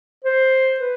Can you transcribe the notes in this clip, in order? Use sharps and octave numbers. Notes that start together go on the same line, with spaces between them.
C5
B4